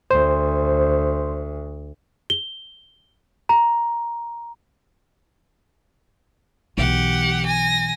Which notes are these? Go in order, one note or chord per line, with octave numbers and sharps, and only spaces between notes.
D2 C5
G7
A#5
B1 E3 G4 F#5
G#5 A#6